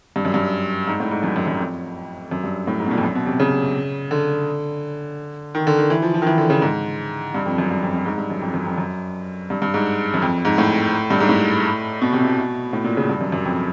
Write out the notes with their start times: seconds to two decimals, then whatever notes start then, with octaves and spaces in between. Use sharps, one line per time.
0.16 G2
0.25 F#2
0.34 G2
0.88 G#2
1.00 A2
1.11 G#2
1.23 F#2
1.36 F#2
1.47 F#2
1.59 F2
2.31 F#2
2.44 G2
2.67 A2
2.80 G#2
2.86 B2
2.91 A#2
2.98 F2
3.04 F#2
3.15 B2
3.26 C3
3.40 C#3
4.11 D3
5.55 D#3
5.67 D3
5.78 D#3
5.90 E3
6.02 F3
6.14 F3
6.22 D#3
6.27 E3
6.38 D3
6.50 C#3
6.62 G#2
7.35 G2
7.46 F2
7.58 F#2
7.70 G2
7.83 F2
7.94 F#2
8.06 G#2
8.18 G2
8.30 F#2
8.41 F2
8.54 F#2
8.65 F2
8.78 F#2
9.50 G2
9.62 G2
9.74 G#2
10.14 F#2
10.22 F2
10.45 G#2
10.58 A2
11.10 G2
11.20 G#2
11.29 A2
12.02 B2
12.13 C3
12.24 B2
12.73 A2
12.84 A#2
12.97 C#3
13.09 G2
13.21 F#2
13.32 F#2
13.45 F2